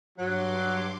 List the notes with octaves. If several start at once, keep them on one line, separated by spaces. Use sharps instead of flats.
G2 F#3 C6 D6